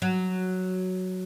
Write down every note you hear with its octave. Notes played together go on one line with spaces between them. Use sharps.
F#3